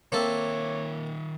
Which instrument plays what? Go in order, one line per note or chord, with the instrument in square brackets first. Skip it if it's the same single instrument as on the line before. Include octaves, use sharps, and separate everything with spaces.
[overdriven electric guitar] D#3 E5 [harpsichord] A#3 C4 A4 [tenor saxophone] C#5